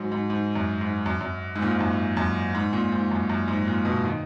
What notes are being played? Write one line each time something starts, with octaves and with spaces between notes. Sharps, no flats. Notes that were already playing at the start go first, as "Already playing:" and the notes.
Already playing: G#2 F#3
G#2
G#2
F#2
G#2
F#2
F#2
G#2
A#2
G#2
F#2
F#2
G#2
A#2
G#2
F#2
F#2
G#2
A#2
B2
D#3